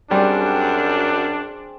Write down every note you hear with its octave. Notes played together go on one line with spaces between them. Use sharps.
F#2 G3 C4 D4 G#4